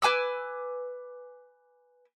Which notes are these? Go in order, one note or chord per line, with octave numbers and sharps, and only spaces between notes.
B4 G#5 D6 E6